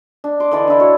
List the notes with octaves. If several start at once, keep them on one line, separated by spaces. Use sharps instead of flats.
D4
C6 D6
D3 E3 D5 D#5
D4 E4
F#4 C#5